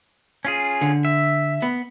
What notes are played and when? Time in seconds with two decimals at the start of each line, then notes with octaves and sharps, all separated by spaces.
0.45 C#4 F4 G#4
0.81 D3
1.05 E5
1.62 B3